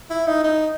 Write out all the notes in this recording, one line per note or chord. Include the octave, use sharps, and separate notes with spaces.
E4
D#4
D#4